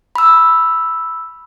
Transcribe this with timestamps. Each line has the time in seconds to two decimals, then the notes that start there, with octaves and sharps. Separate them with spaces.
0.15 B5 E6